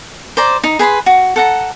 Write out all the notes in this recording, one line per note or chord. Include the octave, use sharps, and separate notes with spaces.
C5 D5 A#5
D#4
G#4 B4 B5 C6
F#4
A4 F#5 A#5